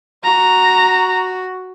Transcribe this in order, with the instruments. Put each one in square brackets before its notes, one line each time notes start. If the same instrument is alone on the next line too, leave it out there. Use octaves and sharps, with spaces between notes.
[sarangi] F#4 [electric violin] A#5